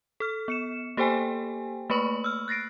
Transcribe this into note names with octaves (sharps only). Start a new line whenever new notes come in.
A4 F6
B3 C#7 E7
A#3 G4 A4 C5 G5 G#5
A3 A#3 B4 B5 C#6 F#7
E6 F6
F#6 A6 A#6 C7 D7